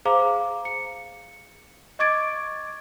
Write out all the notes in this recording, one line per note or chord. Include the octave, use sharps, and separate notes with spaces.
G#4 C5 F5 A#5 D6
C#7
D#5 C#6 D6 G#6 A6 D7